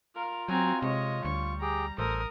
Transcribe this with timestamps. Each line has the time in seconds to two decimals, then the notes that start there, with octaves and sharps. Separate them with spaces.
0.15 F4 A#4 F5
0.49 F#3 C4 F#4 G#5 A#5
0.82 C3 G#3 C#5 D#5
1.25 D2 G3 C#6
1.61 G4 G#4 G5 A#5
1.98 A1 A4 A#4 C5 D#6